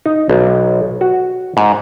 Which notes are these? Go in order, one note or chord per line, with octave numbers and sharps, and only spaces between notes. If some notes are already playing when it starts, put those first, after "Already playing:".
D#4
B1
F#4
G#2